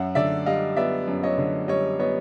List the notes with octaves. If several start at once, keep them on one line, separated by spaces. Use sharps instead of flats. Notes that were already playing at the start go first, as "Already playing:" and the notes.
Already playing: F#2 E5 F#5
D3 D5 E5
G3 D#5 F5
B3 D5 E5
F#2
C#5 D#5
D3
G3 C#5 D#5
B3 C#5 D#5